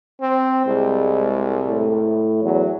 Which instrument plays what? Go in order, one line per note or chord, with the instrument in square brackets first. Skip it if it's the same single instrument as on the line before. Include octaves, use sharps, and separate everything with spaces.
[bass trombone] C4
[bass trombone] C2 [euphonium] G#3
[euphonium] A2
[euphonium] E2 [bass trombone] F#3